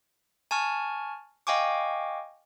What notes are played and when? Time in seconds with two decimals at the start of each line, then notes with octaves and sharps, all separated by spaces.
0.51 G#5 A5 C#6 F6
1.47 D#5 F5 G5 G#5 C#6 D6